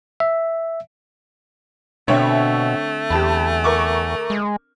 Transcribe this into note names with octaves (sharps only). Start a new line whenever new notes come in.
E5
B2 D3 A3 C4 C#5 E5
E2 G4 A5 B5
A#4 C#6 D6
G#3